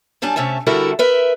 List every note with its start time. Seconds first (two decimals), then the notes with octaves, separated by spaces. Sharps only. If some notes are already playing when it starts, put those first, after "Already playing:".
0.22 F#2 G3 D4 G#5 A5
0.36 C3 A3 C#4 E5 A5
0.66 D3 G3 E4 F#4 A4 A#4
0.99 A#4 B4 E5